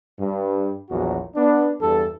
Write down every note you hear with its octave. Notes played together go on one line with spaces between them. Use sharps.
G2
A#1 E2 F#3 F#4
B3 D4
E2 G2 A4